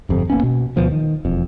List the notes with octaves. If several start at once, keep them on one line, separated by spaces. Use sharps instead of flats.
G1 F2 C3
D#1 A#3 B3 C#4
B2
D2 B2 F3 B3
D#3
E1 F2